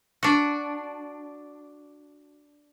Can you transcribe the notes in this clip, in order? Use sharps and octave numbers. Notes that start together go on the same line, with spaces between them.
D4 F#4